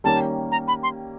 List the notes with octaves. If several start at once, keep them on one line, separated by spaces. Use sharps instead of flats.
D#3 G3 A#3 C#4 A5
A#5
B5
C6